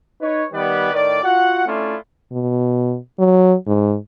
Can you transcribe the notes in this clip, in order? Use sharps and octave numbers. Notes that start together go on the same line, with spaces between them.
D#4 B4 C#5
D#3 G3 B3 B4 D5
A2 D#3 D5
F4 F#4 F#5
A3 C#4 D4 E4 F4
B2
F#3
G#2